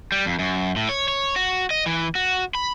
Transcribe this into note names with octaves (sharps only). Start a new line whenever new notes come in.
G3
F2
F#2
A2
C#5
C#5
F#4
D#5
E3
F#4
B5